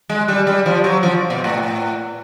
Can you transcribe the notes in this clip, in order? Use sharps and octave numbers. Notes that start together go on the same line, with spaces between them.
G#3
G3
G3
F3
F#3
F3
B2
A2